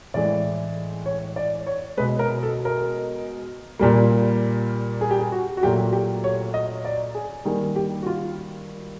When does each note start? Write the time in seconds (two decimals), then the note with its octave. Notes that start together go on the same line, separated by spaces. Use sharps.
0.14 A2 E3 G#3 D5
1.06 C#5
1.36 D5
1.66 C#5
1.97 B2 G#3 B4
2.19 A#4
2.43 A4
2.65 A#4
3.80 A#2 G3 A#3
5.01 G#4
5.11 G4
5.20 G#4
5.32 F#4
5.57 F#4
5.62 A#2 F#3 A3 G4
5.93 G4
6.24 C#5
6.54 D#5
6.85 D5
7.15 G#4
7.45 D#3 G3 A#3 G#4
7.76 G4
8.02 F#4
8.07 F4